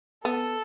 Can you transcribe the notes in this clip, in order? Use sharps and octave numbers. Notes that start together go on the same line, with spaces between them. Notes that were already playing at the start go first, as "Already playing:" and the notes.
B3 A4